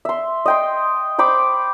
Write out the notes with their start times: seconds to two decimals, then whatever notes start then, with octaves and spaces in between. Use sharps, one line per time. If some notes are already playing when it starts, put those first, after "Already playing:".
0.05 E5 C6
0.46 D#5 G5 C6
1.18 C5 G5 B5 D6